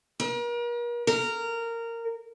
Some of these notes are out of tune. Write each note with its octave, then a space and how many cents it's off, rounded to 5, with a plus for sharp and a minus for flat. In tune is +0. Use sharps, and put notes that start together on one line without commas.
A#4 +40
A#4 -15